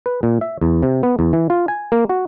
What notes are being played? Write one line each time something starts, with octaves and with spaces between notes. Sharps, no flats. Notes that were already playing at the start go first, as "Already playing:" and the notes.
B4
A#2
E5
E2
C3
B3
E2
E3
F4
G#5
A#3
F#4